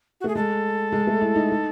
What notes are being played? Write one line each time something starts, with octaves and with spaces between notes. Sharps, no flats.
F#4
A3 G#4
G#3 A4
G#3
A3
E4
D#4
D#4